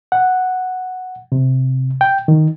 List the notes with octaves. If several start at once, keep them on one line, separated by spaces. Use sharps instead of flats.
F#5
C3
G5
D#3